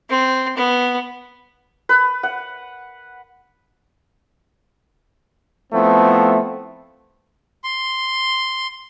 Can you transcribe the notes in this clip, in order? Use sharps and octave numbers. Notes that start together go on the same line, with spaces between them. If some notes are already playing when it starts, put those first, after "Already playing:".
C4
B3
B4
F#5
F3 A3 B3 C4 E4
C6